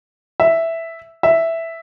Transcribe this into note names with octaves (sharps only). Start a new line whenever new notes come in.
E5
E5